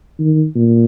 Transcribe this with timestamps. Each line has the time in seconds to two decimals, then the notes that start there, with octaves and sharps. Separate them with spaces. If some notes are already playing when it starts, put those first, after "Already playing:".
0.19 D#3
0.56 A#2